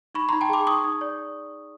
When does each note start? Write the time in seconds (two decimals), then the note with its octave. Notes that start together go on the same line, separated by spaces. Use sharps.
0.15 D#4 B5 C#6
0.29 A#5 C6
0.33 D#4
0.41 G5 A5
0.49 G#4 C6 D6
0.67 D#4 C#6 D#6
0.84 D#4
1.01 D5